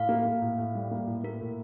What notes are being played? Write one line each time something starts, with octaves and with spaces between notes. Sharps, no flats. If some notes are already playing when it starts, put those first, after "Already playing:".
Already playing: A2 F5
A#3
A#3
A2
A2
G3
A#3
A2
A#3 A#4
A2